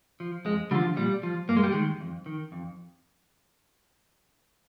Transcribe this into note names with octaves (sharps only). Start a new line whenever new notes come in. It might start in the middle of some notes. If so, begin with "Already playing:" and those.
F3
F2 G#3
D3 F3 G3
A#2 G3
F3
G2 A#3
G#3
G3
D#3 G#3
F2
D#3
F2